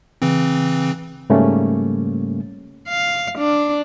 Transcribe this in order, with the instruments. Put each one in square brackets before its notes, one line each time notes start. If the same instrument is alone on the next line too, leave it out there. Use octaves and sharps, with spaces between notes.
[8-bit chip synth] C#3 E3 C4
[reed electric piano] G#2 C#3 G3 A3 A#3 C#4
[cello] F5
D4